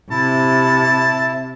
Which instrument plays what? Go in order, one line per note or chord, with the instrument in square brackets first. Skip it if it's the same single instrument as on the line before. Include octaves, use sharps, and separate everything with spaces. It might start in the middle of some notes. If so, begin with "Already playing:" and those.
[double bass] C3 [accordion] E4 [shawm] A5